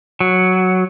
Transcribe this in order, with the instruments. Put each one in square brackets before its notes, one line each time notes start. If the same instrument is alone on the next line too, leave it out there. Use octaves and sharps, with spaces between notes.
[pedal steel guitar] F#3